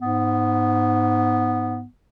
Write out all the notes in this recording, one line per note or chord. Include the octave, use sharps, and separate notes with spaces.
G#2 B3